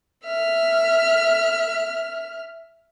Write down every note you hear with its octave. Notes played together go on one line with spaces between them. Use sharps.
E5 F6